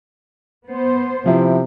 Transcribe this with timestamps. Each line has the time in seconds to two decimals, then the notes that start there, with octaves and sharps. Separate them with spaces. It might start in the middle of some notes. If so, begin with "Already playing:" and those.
0.67 B3 C5
1.26 C3 F3 E4